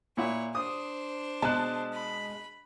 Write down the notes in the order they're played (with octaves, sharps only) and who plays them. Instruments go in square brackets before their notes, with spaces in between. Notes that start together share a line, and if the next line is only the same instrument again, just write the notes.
[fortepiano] A#2 E4 F#5 [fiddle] C#5
[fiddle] D4 C5 [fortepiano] D#6
[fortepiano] B2 [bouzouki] G#3 [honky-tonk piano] A5 F#6
[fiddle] B5